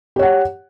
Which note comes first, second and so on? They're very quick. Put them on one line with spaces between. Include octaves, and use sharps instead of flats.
G4 C#5 F#5